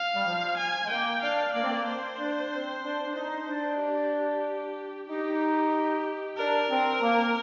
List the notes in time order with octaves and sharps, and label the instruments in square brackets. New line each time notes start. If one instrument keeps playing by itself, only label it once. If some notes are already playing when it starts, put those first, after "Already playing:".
Already playing: [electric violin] F5
[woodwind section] G3
F3
[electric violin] G#5
[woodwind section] G#3
[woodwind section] A#3 [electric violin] G5
[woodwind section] D4 [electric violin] F5
[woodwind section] A#3 [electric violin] D5
[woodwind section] C4
A#3
[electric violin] C5
[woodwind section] D4
C4
D4
D4
[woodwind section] D#4 [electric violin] C5
[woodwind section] D4
[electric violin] G4
[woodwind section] D#4 [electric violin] G4
[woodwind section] D4 [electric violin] A#4
[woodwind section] C4
A#3